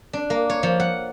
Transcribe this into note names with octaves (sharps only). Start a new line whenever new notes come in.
D4
A#3
C#5
F3
F#5